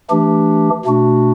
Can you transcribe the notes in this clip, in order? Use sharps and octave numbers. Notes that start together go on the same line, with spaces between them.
E3 A3 D4 G4
B2 A3 D4 F#4